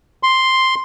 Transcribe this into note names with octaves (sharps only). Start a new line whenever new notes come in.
C6